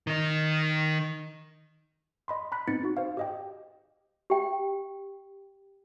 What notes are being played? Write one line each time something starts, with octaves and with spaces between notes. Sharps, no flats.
D#3 D#4
D#5 B5 C6
A#5 B5 F#6 B6
B3 C4 D#4 A6 C#7
D#4 F#4
C5 F5
G4 D#5 G5
G4 G5